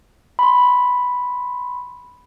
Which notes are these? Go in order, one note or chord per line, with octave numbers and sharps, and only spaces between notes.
B5 C6